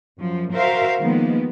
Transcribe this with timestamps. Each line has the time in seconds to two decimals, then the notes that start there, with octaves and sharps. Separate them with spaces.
0.20 F#2 F3
0.54 F#4 A#4 C5 E5 F5
1.00 D#3 F3 G#3 A#3 B3